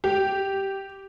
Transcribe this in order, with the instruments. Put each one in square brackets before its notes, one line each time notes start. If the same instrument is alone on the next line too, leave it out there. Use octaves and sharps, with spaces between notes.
[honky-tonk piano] G4